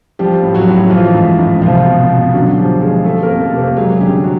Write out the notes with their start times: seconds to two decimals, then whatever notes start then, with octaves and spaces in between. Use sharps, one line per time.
0.19 F3 G3 G4
0.43 A2
0.55 F#3 F#4
0.67 A2
0.90 E3 F3 F4
1.14 G#2
1.39 G#2
1.62 C2 F3 F4
1.86 B2
2.09 B2
2.33 D3 F#3 F#4
2.57 F3 G3 G4
2.81 F3 G#3 G#4
3.04 G3 A3 A4
3.23 A#3 A#4
3.29 F2
3.40 A3 A4
3.53 C3
3.58 A#3 A#4
3.76 F#3 G#3 G#4
3.95 G#4
4.00 D3 G3 G4
4.24 F#3 F#4